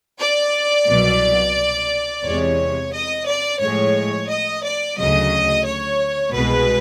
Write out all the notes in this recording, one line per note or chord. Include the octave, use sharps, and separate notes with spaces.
D5
C2 B2 F#3
E2 C3 E3 G#3 C#5
D#5
D5
A2 F3 G#3 C#5
D#5
D5
D2 C#3 F#3 D#5
C#5
C2 B2 G#3 B4